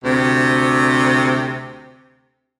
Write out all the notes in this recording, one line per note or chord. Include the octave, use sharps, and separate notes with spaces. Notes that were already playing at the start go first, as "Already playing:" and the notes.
D2 C3